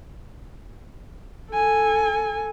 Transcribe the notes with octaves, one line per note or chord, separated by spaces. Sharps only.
A4 G#5